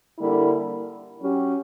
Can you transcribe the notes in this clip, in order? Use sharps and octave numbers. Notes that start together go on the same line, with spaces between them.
D3 G3 A#3 E4
F#3 C#4 G4